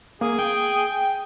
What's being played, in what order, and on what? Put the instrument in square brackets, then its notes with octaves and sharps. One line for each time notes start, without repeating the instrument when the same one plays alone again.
[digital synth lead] A#3 [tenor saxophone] G#4
[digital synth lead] G5